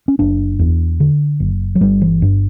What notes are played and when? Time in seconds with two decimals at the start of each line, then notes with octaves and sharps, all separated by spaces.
0.08 C#4
0.19 F#1 D4
0.59 E2
1.00 D3
1.40 F#1
1.75 F#3
1.81 G1 G3
2.02 E3
2.22 G2